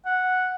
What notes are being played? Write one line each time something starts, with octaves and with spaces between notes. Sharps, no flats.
F#5